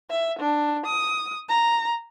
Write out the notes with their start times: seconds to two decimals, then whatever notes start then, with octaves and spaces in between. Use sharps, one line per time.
0.10 E5
0.40 D4
0.86 D#6
1.49 A#5